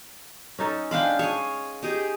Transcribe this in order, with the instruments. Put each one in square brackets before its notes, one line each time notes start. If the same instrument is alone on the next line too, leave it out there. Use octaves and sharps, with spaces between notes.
[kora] C#4 D#4 A4
[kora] G#3 G5 [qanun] D4 F5 B5
[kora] G#4 [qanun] C#5 G#5
[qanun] D#4 G4 G#4